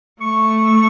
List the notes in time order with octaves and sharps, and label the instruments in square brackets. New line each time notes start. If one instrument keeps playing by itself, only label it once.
[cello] A3 [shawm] C#6